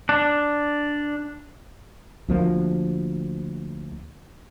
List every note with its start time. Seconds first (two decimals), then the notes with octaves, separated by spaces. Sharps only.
0.09 D4
2.28 D2 F3 A#3